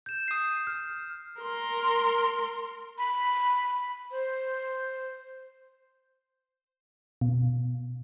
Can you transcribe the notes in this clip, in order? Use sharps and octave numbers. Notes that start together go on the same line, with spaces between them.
G6 E7
D#6 C7
F6
A#4 C6
B5
C5
B2